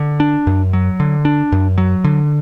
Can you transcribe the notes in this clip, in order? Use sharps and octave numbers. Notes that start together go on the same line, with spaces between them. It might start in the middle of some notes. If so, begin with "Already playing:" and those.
Already playing: D3
D4
F#2
F#3
D3
D4
F#2
F#3
D3